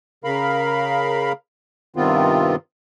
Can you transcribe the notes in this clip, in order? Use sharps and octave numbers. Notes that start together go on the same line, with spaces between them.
C#3 A#4 F5 B5
G2 C3 D#3 B3 C4 F4